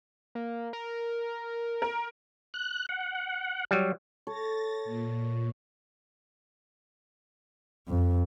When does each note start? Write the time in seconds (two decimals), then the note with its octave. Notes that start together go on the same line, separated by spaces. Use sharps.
0.35 A#3
0.73 A#4
1.82 A#4
2.54 F#6
2.89 F#5
3.71 F#3 G3
4.27 A4 C#5 A6 A#6
4.85 A#2
7.88 F2